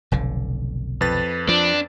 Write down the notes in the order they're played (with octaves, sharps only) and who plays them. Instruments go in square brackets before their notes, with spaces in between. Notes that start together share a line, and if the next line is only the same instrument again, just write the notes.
[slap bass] F1 B1 D3
[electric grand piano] F2 B4 A6
[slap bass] F3 [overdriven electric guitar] D4